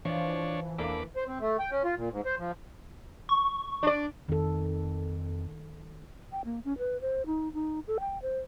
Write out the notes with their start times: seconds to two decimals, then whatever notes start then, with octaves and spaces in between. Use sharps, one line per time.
0.05 E3 F3 D4 C#5
0.78 E2 A#3 D4 A4 B5 D6
1.16 C5
1.27 C4
1.40 A3
1.59 G5
1.71 C#4
1.84 F4
1.96 A#2
2.12 G#2
2.26 C5
2.39 F3
3.29 C#6
3.83 D4 D5
4.29 F2 D#3 A4
6.32 G5
6.45 A#3
6.65 C#4
6.78 B4
7.01 C5
7.26 D#4
7.53 D#4
7.87 A4
8.00 G5
8.22 C5